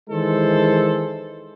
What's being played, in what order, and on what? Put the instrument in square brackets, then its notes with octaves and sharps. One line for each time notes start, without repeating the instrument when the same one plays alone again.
[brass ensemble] D#3 E3 G#3 A4 C5